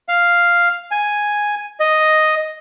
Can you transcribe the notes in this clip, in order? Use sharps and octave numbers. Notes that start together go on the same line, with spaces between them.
F5
G#5
D#5